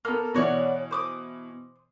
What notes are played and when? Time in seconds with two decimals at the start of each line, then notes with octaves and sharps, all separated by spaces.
0.05 A#3 B3 A4 F6
0.34 B2 E3 F#4 C#5 D5
0.91 C5 D6 D#6